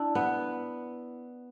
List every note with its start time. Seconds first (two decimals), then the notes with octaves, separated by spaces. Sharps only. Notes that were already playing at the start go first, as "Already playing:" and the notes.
Already playing: D4 E4
0.15 B3